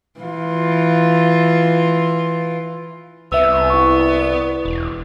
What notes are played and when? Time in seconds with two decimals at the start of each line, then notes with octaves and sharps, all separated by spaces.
0.20 E3 F4
3.32 C2 B3 E5 E6
3.70 E4 C#6
4.65 E1